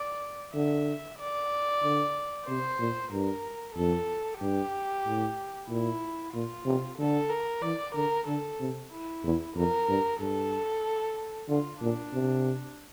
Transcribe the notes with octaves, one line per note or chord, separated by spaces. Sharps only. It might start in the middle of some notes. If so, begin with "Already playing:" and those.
Already playing: D5
D3 E5
D5
D3
C3 C5
A#2
G2 A#4
F2 A4
G2 G4
A2
A#2 E4
A#2 F4
C3
D3 A4
A#4
E3 D5
D3 A#4
D3 A4
C3
E4
E2
F2 A#4
G2
G2 A4
D3 F4
A#2 D4
C3